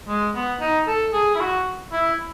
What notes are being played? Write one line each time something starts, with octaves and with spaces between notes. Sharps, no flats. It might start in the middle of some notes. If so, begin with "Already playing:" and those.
G#3
B3
D#4
A4
G#4
E4
F#4
E4